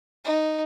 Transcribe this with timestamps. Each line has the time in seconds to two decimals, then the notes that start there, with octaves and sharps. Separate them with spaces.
0.24 D#4